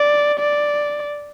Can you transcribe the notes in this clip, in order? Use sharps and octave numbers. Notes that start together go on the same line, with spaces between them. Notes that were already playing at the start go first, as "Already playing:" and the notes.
Already playing: D5
D5